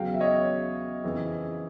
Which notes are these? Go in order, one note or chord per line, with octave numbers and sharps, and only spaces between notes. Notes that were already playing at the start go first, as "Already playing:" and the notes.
Already playing: E2 C#3 F#3 F5 G5
E5
C#5 D#5
F2 C#3 E3